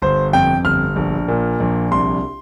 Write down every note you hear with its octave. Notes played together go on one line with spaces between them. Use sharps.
G1 C5
F2 G5
G1 F6
A#1
A#2
A#1
C2 C6